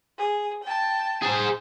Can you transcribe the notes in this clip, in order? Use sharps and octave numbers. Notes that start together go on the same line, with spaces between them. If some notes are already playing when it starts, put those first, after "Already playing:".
G#4
G5 A5
G#4 C5